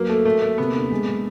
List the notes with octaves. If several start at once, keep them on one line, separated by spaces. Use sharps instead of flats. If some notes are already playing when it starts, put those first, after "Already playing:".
Already playing: F#3 A#3 B4
A3 A4
A3 A#3
A3 A#3
C3 B3
D4
G#3
G#3